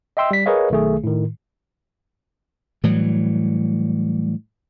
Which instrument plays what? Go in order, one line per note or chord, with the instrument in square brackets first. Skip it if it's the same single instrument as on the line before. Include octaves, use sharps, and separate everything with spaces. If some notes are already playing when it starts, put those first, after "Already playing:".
[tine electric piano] D#5 E5 G5 C6 E6
G3 B6
G#4 A#4 B4 C#5 D#5 F5
B1 D#3 A3 G#4
A2 D#3
[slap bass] A2 E3 F#3 G3